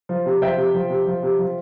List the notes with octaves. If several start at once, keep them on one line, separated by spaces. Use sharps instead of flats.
F3
C3
F3 E5 G5
C3
F3
C3
F3
C3
F3